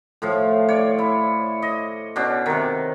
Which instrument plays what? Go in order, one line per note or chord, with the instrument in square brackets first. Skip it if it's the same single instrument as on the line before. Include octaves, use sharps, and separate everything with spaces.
[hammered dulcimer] A2 F3 F4
C#5 D5
E4
D#5
B2 C#4 D4
C3 D#3